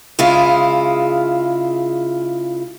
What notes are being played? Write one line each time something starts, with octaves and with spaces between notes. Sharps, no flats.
C#3 G#3 E4 F4